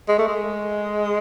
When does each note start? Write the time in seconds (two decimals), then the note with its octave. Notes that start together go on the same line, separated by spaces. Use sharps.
0.08 G#3
0.19 A3
0.28 G#3